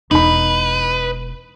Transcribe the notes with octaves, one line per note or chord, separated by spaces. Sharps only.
E1 D#4 E4 B4 B5